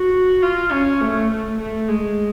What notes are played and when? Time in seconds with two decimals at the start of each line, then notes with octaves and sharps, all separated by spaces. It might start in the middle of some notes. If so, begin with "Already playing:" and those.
Already playing: F#4
0.42 F4
0.72 C#4
1.01 A3
1.30 A3
1.58 A3
1.88 G#3